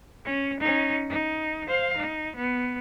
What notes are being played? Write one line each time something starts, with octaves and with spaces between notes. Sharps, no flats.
C#4
C#4 D#4
D#4
C5 F5
D#4
B3